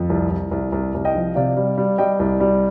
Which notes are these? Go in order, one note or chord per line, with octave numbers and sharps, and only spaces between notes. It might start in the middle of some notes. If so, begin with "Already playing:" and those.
Already playing: F2
C2
C2
C2
C2
C2
D#5 G5
F3
C3 D5 F5
G3
G3
G3 D#5 G5
C2
G3